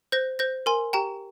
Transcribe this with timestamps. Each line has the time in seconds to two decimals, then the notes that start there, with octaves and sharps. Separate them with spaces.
0.12 C5 G6 A#6
0.39 C5 G6 A#6
0.66 A#4 G#5 C6
0.93 G4 G5 A#5